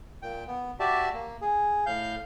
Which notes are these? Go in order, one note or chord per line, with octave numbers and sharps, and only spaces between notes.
A#2 G5
B3
F#4 G4 D5 E5 A5
A#3
G#4
A2 F5 G6